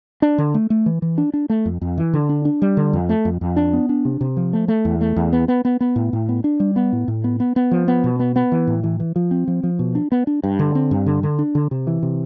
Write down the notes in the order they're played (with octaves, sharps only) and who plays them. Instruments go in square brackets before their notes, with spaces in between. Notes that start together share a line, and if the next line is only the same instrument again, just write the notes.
[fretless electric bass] D4
D3
A3
A3
E3
E3
D4
D4
A3
F2
F2
E3
D3
D4
D4
G3
D3
F2
A3
F2
F2
D4
B3
D4
C3
C3
F3
A3
A3
E2
A3
E2
B3
B3
B3
B3
A2
A2
B3
D4
G3
B3
A2
A2
B3
B3
B3
F3
B3
B2
B3
B3
E3
A2
E3
E3
F3
C4
F3
F3
B2
D4
B3
D4
G2
D3
C4
G2
D3
D3
D4
D3
C3
E3
C3